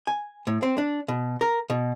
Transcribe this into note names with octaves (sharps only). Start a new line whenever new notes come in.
G#5
A2
C4
D4
B2
A#4
B2